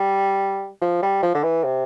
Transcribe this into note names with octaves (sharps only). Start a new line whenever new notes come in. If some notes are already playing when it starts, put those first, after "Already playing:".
Already playing: G3
F3
G3
F3
D3
E3
C3